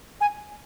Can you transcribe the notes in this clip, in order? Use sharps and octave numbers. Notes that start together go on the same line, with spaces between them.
G#5